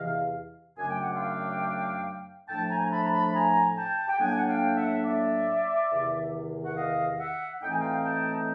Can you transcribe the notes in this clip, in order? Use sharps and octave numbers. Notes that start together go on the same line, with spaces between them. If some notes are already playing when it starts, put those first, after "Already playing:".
Already playing: E2 C3 E3 D#5 F5
F#2 C#3 F#3 A3 D4 G#5
G5
F#5
F5 G5
A2 F3 A3 D4 G5 A5
G#5 A#5
A#5
A5 B5
A#5
A5 B5
G#5 A#5
G5 A5
G5
A2 F#3 A#3 D4 F#5 G#5
F#5
F5 G5
E5 F#5
D5 E5
E2 C3 D#3
F#5
D#5 F5
E5 F#5
A2 E3 A3 C4 D#4 G5
G#5
F5 G5
G5 A5